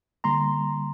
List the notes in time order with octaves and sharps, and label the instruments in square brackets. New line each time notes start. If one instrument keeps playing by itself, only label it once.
[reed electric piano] D3 G3 A#3 A#5 C6